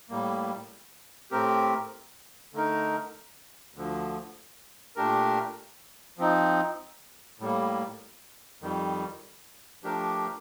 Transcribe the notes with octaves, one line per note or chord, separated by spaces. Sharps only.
A2 G3 A#3
A2 A3 C4 G4 A#4
D3 A3 D#4 A#4
D2 D3 F3
A#2 A3 D4 G4 A#4
F3 C4 D#4
A2 G3 A#3
F2 D#3 G3
F3 A3 D4 G4 A#4